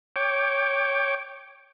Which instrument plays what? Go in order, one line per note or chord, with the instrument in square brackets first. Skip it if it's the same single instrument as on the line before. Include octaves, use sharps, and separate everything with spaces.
[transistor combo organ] C#5 G5 D6